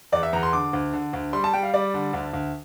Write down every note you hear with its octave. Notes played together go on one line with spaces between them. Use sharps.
E2 D5
E5
E2 A#5
C6
D3 D6
D2
D3
D2
G3 C6
A5
G3 G5
F5
G3 D5
D3
D2
D2